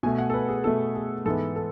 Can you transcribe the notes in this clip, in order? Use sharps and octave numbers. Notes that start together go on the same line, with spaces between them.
B2 A3 G#5
F#5
A4
B4
G#4
B2 A3 A4
G#4
G#2 E3 B3 A4
A4